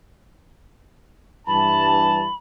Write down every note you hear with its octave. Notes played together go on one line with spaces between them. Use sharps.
G2 E3 A5 B5